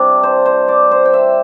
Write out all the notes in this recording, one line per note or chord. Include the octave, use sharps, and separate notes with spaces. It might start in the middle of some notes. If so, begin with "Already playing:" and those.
Already playing: C3 G3 D4 D5
C5
C5
D5
C5
G5
E5